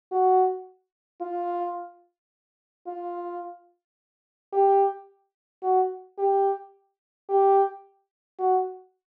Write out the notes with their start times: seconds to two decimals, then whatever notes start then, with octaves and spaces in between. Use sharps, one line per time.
0.11 F#4
1.21 F4
2.87 F4
4.53 G4
5.63 F#4
6.18 G4
7.29 G4
8.39 F#4